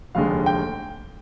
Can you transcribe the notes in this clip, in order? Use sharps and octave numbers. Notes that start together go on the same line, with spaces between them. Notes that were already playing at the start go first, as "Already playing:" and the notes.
F1 D#2 D3 G#3 F5
G5